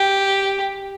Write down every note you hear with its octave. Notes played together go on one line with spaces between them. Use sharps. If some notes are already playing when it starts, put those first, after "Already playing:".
Already playing: G4